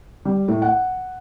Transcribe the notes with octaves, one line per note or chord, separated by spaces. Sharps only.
G3
A2
F#5